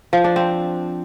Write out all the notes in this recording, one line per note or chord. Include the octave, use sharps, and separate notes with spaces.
F3
D4
C4